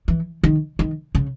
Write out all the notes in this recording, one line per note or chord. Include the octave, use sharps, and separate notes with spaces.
E3
D#3
D#3
C#3